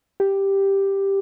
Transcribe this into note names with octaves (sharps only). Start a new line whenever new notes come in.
G4